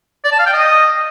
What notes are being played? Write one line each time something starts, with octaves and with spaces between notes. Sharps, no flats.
D5
A5
F5
G5
D#5